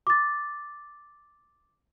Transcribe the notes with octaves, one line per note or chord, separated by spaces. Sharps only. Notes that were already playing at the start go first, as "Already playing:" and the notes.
D6 A6